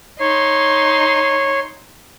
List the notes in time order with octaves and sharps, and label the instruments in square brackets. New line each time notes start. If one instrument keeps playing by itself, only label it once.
[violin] D#4 C6 [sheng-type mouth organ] C#5